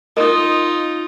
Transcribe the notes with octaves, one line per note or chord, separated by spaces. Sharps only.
D#4 F4 A#4 D#5 D#6